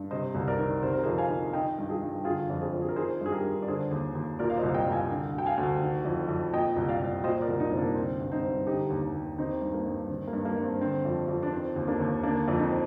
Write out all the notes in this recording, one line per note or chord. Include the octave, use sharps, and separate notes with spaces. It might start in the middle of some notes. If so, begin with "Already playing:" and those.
Already playing: G2
C3 C5 D#5
C2
A#4 D5
D#3
C3 C5
A#4
F2 G#4 C5
F5 G#5
D#3
D#3 D#5 G5
G2
F4 G#4
G2
D3 F4 G#4
F2
G#4 C5
F2
G#4
A#4
D#3 G#4 C5
G2 G#4
G4 A#4
G2
D5
D3 G#4 C5
D#2
D#2
A#2 A#4 D5
F5
C5 D#5
C2
D#5 G5
C2
F5 G#5
D3
D2 G5
F5 G#5
D2
D#3
F2
F2
A#2 D#5 G5
C2
D5 F5
C2
A#2 C5 D#5
A#4 D5
C2
C4 D#4
C2
A#3 D4
D3 C4
G2
C4 D#4
G2
D3 D#4 G4
D#2
D#2
D#3 C4 D#4
G2
A#3
G2
D#3 C4
A#3
G2
A#3
G2
C4
D3 C4
F2
F2
D4
D#3 C4
D#2
A#3 D4
D#2
D3 A#3 D4
F2
C4 D#4